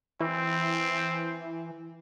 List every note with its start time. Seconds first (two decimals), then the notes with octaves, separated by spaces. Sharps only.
0.20 E3 C4